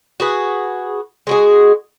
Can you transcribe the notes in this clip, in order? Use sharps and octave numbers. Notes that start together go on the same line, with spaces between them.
F#4 G#4 B4
G#3 F#4 G#4